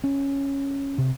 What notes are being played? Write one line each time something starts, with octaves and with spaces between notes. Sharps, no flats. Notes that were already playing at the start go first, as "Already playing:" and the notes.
C#4
C3